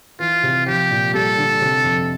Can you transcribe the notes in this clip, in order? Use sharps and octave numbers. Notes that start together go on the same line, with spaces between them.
E3 F4
C3
F3 G4
A#2
G3 A4
D3
C3
F2